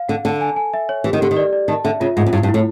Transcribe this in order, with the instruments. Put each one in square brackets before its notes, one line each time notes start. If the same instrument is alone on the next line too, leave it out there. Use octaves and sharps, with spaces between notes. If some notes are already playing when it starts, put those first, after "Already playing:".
Already playing: [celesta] F5
[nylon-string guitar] D3 [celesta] F#5
[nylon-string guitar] D3 [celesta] A5
[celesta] G#5
G#5
E5
C#5
[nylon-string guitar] E3 [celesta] G4
[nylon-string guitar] D#3
[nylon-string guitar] D3 [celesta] G4
[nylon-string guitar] D#3
[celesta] D5
D5
[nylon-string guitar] D#3 [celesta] A5
[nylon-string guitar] D3 [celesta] E5
[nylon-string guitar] C#3 [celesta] F4
[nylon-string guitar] G#2 [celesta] F4
[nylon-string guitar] F#2
[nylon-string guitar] G2 [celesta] E4
[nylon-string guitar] G2
[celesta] E4
[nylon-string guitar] A2